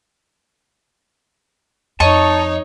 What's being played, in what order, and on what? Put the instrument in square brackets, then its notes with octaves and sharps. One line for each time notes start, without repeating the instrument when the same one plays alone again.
[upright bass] F2 [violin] D#4 C#5 [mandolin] D#5 C#6 [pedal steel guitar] A5